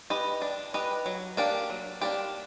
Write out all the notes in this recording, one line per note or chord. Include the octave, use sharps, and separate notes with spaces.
G4 B4 D#5
D4
G4 B4 D#5
F#3
A#3 D4 G4
F#3
A#3 D4 G4